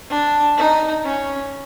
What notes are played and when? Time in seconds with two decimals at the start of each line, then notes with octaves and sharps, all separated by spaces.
0.10 D4
0.57 D#4
1.05 C#4